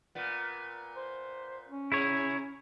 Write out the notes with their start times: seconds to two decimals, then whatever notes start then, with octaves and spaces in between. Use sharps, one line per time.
0.15 A#2 B3
0.97 C5
1.68 C#4
1.92 C3 E4 G#4 C#5